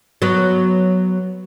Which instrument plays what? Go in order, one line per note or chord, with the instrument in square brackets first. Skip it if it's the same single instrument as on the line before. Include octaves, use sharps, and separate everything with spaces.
[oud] F#3 B3